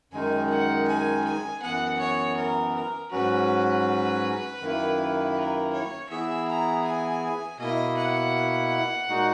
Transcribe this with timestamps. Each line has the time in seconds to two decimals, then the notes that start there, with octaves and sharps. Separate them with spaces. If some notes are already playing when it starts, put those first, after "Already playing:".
0.12 F#2 D#3 G#3 D#4 G#5
0.49 F#5
0.87 G#5
1.24 G#5
1.62 F#2 E3 B3 F#5
1.99 C#5
2.36 A#4
2.74 A#4
3.11 G#2 F#3 C#4 F#4 B4
4.60 F#2 D#3 A#3 E4
5.35 A#4
5.73 C#5
6.09 E3 B3 E4 G#4 E5
6.47 A#5
6.84 G#5
7.59 B2 A#3 E4 D#5
7.97 F#5
9.08 A#2 G#3 D#4 F#4